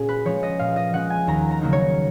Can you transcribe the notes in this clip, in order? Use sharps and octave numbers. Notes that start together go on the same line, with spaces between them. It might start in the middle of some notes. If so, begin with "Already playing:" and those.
Already playing: A#2 C#4 F#4 G#4
B4
F3 G#3 C#4 C#5
D#5
A#2 F5
D#5
F3 G#3 C#4 F#5
G#5
D#2 A#5
A#5
C#3 F#3 A#3 D#4
C#5